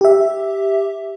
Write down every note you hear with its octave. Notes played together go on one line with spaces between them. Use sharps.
G4 E5